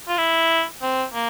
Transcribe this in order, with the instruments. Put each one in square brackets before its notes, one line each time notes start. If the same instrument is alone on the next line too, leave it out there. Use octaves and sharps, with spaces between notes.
[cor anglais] F4
E4
C4
A#3